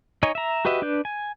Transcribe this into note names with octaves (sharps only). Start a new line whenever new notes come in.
D#4 C#5 D#5 G#5
E5 A#5
F#4 G4 B4 D#5 E5
D4 B4 G6
G#5